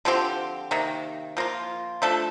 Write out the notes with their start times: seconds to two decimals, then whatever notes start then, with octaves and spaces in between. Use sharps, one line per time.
0.05 D3 F3 C4 G4
0.71 C3 D#3 A#3
1.37 F3 A#3 F4
2.02 F3 A3 D4 A4